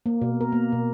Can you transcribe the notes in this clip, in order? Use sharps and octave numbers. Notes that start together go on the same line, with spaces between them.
A#3
B2
A#4
A#3
B2